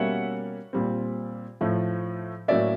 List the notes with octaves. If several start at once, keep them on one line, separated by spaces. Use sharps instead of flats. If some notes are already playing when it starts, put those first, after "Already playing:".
Already playing: B2 G3 A#3 C#4 E5 F#5
A#2 G3 C4
A2 F3 A3
A2 F#3 A#3 C#4 D5 E5